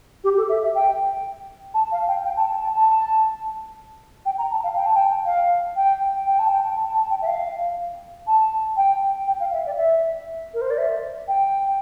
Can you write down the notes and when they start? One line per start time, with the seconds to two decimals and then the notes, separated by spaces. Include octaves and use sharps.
0.24 G4
0.37 A4
0.49 E5
0.63 E5
0.75 G5
1.74 A5
1.92 F5
2.08 G5
2.24 G5
2.37 A5
2.50 A5
2.63 A5
2.76 A5
4.26 G5
4.38 A#5
4.51 A5
4.64 F5
4.76 G5
4.86 A5
4.96 G5
5.26 F5
5.76 G5
6.26 G5
6.39 A5
6.51 G5
6.77 A5
6.94 A5
7.10 G5
7.22 E5
7.27 F5
8.27 A5
8.77 G5
9.27 G5
9.40 F5
9.53 E5
9.66 D5
9.77 E5
10.54 A#4
10.61 C5
10.71 D5
10.78 E5
11.28 G5